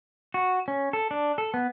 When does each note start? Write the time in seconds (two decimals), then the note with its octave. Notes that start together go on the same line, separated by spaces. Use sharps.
0.34 F#4
0.68 C#4
0.93 A4
1.11 D4
1.38 A4
1.54 B3